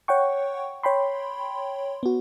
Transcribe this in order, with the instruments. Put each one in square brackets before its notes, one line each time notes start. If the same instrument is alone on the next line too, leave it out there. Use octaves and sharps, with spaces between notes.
[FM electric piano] C#5 F#5 G5 C#6
C#5 G5 B5 C6
B3 F#4